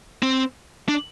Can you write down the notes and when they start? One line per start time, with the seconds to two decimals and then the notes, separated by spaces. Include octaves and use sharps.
0.23 C4
0.89 D4